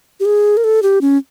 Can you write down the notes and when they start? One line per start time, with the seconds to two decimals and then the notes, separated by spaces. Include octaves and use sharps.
0.20 G4
0.25 G#4
0.57 A#4
0.64 A4
0.83 G4
1.01 C#4